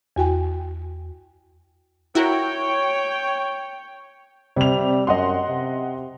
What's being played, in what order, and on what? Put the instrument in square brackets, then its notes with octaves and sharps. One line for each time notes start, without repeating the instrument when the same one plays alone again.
[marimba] E2 F#4 G5 G#5
[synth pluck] E4 F#4 A#4 [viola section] C#5 G5
[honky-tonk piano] C3 F7 [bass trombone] G3
[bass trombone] F#2 [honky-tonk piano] D#5 F#5 C6
[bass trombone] C3